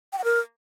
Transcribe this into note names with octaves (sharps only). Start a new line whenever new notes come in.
G5
F#5
A#4